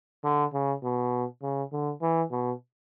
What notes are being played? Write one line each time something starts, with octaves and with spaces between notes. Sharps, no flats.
D3
C#3
B2
C#3
D3
E3
B2